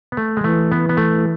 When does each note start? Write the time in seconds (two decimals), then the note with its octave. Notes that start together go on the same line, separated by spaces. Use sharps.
0.12 B3
0.17 A3
0.37 G#3
0.44 E3 A3
0.72 B3
0.89 B3
0.97 A3